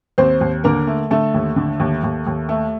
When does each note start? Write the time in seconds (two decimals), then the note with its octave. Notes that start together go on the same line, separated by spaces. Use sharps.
0.18 D#2 C4 C5
0.41 D#2
0.64 D3 A#3 A#4
0.87 A3
1.11 D3 A3 A4
1.34 D#2
1.56 D3
1.80 D#2
2.03 D#2
2.27 D#2
2.49 A3